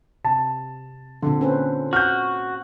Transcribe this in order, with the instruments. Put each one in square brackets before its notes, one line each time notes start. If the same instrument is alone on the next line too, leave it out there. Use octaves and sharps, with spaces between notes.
[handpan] C3 [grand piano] A5
[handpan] A#2 C4 A4 [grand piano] D3
[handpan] C#4 B4 C5
[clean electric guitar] F#4 [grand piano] F6 G6